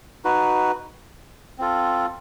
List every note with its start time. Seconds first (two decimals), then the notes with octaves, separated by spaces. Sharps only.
0.25 D#4 F#4 B4
1.58 C4 F4 A4